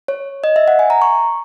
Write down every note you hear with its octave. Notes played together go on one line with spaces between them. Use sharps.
C#5
D#5
E5
F#5
G#5
A#5
C#6